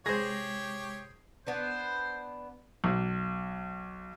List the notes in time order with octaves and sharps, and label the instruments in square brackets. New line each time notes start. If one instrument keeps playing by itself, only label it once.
[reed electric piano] C3 G#3 [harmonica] G4 C#5 [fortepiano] G#4 C5 [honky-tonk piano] A#6
[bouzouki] B3 D4 B4 [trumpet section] C5
[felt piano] B1